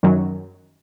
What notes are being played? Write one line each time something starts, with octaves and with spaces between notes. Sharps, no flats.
F#2 D#3 F#3